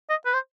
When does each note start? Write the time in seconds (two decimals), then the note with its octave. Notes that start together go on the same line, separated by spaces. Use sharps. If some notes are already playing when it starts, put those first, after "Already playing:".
0.10 D#5
0.26 B4
0.34 C5